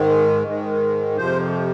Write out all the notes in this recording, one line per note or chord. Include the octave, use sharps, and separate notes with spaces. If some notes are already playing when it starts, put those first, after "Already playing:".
Already playing: G#2 D#3 G#3
G#2 D#3 G#3
F2 C3 F3 C5